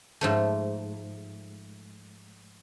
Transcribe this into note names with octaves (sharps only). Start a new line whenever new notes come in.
G#2 F3 A3